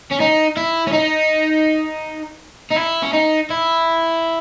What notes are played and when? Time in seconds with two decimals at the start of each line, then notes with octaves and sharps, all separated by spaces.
0.11 C#4
0.20 D#4
0.57 E4
0.87 C#4
0.93 D#4
2.71 D#4
2.77 E4
3.03 C#4
3.13 D#4
3.51 E4